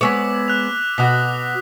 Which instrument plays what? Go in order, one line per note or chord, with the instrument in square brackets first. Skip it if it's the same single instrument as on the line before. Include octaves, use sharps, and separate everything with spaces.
[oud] G#3 B3 C#5 [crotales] D6 E6 B6
[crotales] E6 F#6 F7
[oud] B2 F#4 [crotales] D#6 B6